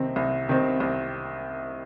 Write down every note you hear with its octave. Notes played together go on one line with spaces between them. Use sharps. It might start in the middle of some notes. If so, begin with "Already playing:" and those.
Already playing: C2 C3 D#3 C4
C2
C3 D#3 C4
C2